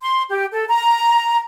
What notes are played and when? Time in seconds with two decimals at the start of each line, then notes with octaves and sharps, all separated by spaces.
0.03 C6
0.30 G4
0.52 A4
0.68 A#5